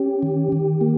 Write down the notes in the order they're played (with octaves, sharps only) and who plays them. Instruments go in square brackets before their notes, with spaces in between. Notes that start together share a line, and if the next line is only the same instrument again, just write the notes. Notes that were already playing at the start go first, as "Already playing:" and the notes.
Already playing: [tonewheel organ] C#4 G4
D#3
D#3
A#3